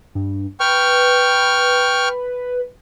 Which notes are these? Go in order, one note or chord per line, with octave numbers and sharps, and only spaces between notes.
G2
B4 G5 C#6 F6